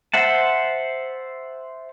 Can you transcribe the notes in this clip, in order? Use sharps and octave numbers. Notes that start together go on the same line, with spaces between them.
C5 E5 F#5 A5